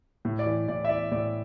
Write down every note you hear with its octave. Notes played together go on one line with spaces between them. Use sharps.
A2
D5
E3
A2 D5
E5
E3 D5
A2 D5